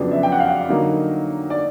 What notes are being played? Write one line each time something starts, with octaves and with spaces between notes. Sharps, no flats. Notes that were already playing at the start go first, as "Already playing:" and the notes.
Already playing: F2 C#3 F#3 B3 D4
E5
G5
F#5
F5
D3 F#3 A#3 D#4
D5